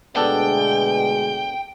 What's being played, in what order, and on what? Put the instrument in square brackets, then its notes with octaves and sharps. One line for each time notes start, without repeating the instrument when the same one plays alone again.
[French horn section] D2 B2 G#3 [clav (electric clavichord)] B3 D4 A4 [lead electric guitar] G5